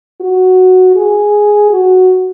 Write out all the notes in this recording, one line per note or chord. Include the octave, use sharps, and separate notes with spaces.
F#4
G#4
F#4